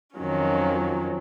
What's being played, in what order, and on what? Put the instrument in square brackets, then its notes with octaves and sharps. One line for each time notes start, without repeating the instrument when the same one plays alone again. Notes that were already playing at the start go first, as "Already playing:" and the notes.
[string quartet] F2 D#3 F#3 C#4